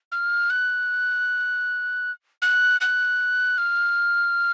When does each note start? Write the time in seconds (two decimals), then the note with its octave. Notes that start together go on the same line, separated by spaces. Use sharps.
0.12 F6
0.50 F#6
2.42 F#6
2.81 F#6
3.58 F6